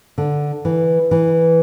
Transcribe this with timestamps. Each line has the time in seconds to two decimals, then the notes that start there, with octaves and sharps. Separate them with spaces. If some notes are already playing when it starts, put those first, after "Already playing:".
0.18 D3
0.65 E3
1.11 E3